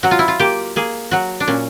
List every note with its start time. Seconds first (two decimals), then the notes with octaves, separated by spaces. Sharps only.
0.03 F#3 F#4
0.11 F4
0.19 E4
0.28 F4
0.40 A#3 G4
0.76 A#3 G#4
1.11 F#3 F#4
1.40 D4
1.47 A#2 C#4